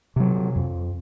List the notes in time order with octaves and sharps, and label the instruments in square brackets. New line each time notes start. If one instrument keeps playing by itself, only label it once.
[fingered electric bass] C3 F#3
F2